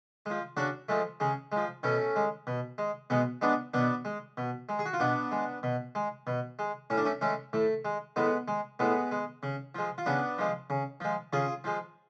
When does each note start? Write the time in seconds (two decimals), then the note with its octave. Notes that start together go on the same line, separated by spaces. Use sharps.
0.26 F3 G#3
0.57 C#3 D4 F#4
0.89 F3 G#3 A3
1.20 C#3 G#3
1.52 F3 G#3
1.83 B2 A3 C#4
2.16 G#3
2.47 B2
2.78 G#3
3.10 B2 G#3 B3
3.41 G#3 B3 D4
3.74 B2 B3 D4
4.05 G#3
4.37 B2
4.69 G#3
4.79 G#4
4.86 F#4
4.93 F4
5.00 B2 B3 D4
5.32 G#3
5.63 B2
5.95 G#3
6.27 B2
6.59 G#3
6.90 A2 C#4
6.97 D4
7.05 A3 C#4
7.21 G#3 A3 C#4
7.53 A2 A3
7.85 G#3
8.16 A2 G#3 B3
8.48 G#3
8.79 A2 G#3 B3
9.11 G#3
9.43 C#3
9.75 F3 G#3
9.98 F4
10.06 C#3 B3 D4
10.38 F3 G#3
10.70 C#3
11.00 F3 G#3
11.33 C#3 F4 G#4
11.64 F3 G#3